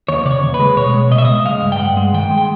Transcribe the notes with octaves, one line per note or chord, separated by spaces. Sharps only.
D#2 C#5
C#3 D5
C#5
D#2
B4
G#3
B2 C#5
G#3
B2 D#5
E5
C#2 D#5
G#3 F5
G2
G5
G2 F#5
G#3
D#3 G5
G#3
G5